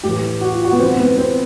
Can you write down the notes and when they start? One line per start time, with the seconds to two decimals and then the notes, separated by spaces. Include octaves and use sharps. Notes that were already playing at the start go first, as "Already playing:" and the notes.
0.03 A2 E3 G4
0.41 F#4
0.52 F4
0.65 F#4
0.73 B3
0.80 G#2 E3 C4
0.99 B3
1.18 C4